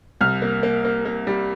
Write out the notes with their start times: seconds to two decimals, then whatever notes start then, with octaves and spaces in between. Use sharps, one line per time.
0.21 C2 F6
0.42 A#3
0.63 A#3
0.85 A#3
1.05 A#3
1.27 G3